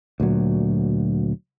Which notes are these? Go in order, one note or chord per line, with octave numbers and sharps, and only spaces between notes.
D2 A#2 F#3